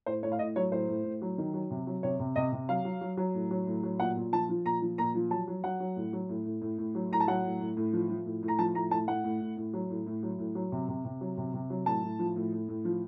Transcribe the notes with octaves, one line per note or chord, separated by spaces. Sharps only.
A2 C5
A2 C#5
F5
A2 D#5
F#3 C#5
A2 C5
A2
A2
F#3
D#3
F#3
C3
F#3
C3 C#5
C3
C3 D#5
C3
F#3 F5
F#3
F#3
F#3
A2
F#3
A2
F#3
A#2 F#5
A#2
F3 A5
F3
A#2 A#5
F3
A#2 A#5
F3
F#3 A5
F#3
F#3 F#5
F#3
A2
F#3
A2
A2
A2
A2
F#3
A2 A#5
A5
F#3 F#5
A2
A2
A2
F3
F3
A2
A2
A#5
F3 A5
A2 A#5
A2 A5
A2 F#5
A2
A2
A2
F#3
A2
A2
F#3
A2
F#3
C3
C3
C3
F#3
C3
C3
F#3
A2 A5
A2
F3
A2
A2
A2
F3